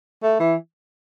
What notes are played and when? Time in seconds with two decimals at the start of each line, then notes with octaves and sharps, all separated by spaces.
0.23 A3
0.39 E3